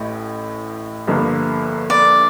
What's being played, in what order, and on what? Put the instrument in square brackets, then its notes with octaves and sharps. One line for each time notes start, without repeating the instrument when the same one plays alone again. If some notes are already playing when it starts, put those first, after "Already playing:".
Already playing: [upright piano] A1 A2 A3
G1 G2 D3 F3 A#3
[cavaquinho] D5